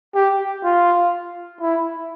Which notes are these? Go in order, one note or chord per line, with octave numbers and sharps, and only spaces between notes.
G4
F4
E4